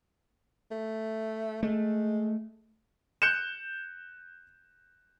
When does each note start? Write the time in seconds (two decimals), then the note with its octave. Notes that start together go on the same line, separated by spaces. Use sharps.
0.71 A3
1.63 G#3 A3
3.22 F#6 G6 C#7 E7